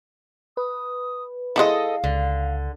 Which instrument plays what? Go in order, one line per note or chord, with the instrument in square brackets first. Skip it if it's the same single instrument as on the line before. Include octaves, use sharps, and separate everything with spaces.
[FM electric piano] B4 [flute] D#6
[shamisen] G#3 D#4 E4 [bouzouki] A4 D#5 [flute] F5
[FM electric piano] C#2 [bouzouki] D3